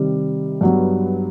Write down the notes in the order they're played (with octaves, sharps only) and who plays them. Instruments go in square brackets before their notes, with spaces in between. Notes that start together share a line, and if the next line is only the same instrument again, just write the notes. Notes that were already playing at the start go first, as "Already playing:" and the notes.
Already playing: [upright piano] C3 D#3 G3
G2 F#3 B3